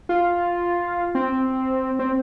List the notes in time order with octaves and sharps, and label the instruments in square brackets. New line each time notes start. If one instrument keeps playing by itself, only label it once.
[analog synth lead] F4
C4
C4